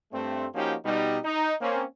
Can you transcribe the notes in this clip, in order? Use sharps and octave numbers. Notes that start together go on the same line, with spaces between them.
G2 A3 C4
F3 A#3 C#4 D#4 F#4 G4
B2 G3 D#4
D#4
A#3 C4 C#4